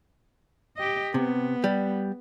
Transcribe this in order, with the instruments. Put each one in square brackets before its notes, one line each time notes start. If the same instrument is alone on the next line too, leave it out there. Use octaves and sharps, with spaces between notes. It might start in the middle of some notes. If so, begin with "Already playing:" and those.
[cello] G4 D#5
[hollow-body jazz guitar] C3 [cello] B3
[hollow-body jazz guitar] G3